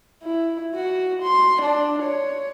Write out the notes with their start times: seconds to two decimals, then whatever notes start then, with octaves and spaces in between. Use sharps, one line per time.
0.23 E4
0.75 F#4
1.23 C6
1.62 D4
2.03 C#5